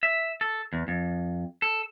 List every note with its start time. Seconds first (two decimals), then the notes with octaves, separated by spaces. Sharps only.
0.03 E5
0.41 A4
0.73 E2
0.88 F2
1.62 A4